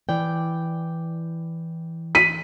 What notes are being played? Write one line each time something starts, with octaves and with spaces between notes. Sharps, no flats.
E3 D5 G5
B6 D#7